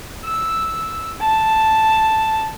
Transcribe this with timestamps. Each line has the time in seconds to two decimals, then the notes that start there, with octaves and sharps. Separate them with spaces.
0.25 E6
1.21 A5